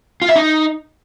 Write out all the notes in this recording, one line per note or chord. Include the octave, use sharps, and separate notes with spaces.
F4
E5
D#4